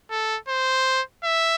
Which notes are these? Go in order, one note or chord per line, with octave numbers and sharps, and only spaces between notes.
A4
C5
E5